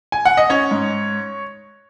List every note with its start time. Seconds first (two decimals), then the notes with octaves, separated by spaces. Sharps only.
0.12 G#5
0.25 F#5
0.37 D#5
0.50 C#4 C#5
0.71 G#2